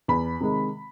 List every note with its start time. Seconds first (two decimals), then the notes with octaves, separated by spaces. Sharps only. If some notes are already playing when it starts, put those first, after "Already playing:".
0.08 E2 B5
0.41 C3 D#3 G#3